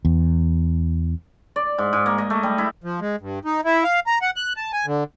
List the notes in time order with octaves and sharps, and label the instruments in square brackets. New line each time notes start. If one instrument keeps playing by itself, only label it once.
[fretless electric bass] E2
[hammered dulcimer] D5
G#2
G#2
A#3
D#5
A3
G3
E4
[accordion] F3
G#3
G2
D#4
E4
F5
A#5
F#5
F#6
A5
G#5
D3